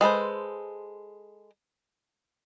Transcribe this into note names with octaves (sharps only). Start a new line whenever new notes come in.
G#3 A4 B4 C5